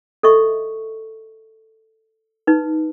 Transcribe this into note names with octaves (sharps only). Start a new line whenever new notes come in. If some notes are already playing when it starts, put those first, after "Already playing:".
A4 D#5 E5 C#6
D#4 B4